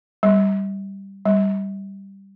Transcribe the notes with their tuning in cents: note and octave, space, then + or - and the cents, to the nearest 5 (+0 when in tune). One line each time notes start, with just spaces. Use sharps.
G3 +0
G3 +0